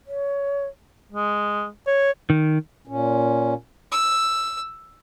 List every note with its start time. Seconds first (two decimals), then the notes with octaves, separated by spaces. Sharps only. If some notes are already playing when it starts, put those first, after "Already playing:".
0.07 C#5
1.12 G#3
1.87 C#5
2.30 D#3
2.87 A#2 C#4
3.92 E6